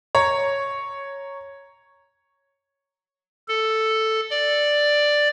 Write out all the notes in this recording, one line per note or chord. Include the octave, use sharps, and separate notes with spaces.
C#5 A#5
A4
D5